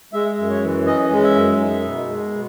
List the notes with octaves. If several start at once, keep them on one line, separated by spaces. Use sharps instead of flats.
G#3 E5
F#2
C#5
E3
C#4 D#5
G#3
E5
F#2
D#4
B2
G#3
B2